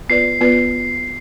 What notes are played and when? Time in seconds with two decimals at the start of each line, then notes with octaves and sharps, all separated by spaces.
0.09 B3 F4 B4 D5 C7
0.41 B3 F4 B4 D5